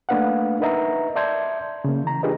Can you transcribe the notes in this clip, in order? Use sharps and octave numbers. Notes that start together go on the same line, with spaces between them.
A3 A#3 D4 B4 F5 F#5
D#4 A#4 B4 D#5 E5 A#5
D5 E5 A5 C6 G6 G#6
C#3 A#3
E3 A#5
D4 F4 G4 G#4 B4 D#5